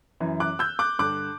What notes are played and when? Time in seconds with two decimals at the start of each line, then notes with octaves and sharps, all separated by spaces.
0.20 F#2 E3
0.40 D6 F#6
0.59 E6 G6
0.79 D6 F#6
0.99 G2 D3 D6 F#6